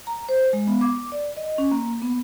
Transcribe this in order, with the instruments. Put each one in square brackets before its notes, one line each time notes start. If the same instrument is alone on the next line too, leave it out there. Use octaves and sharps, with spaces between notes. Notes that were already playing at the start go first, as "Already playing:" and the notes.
[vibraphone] A#5
C5
G#3
B3
D6
D5
D#5
C#4
A#3
B3